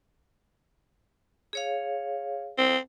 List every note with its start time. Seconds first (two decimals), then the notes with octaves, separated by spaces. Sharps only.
1.53 G#4 C#5 F5
2.58 C4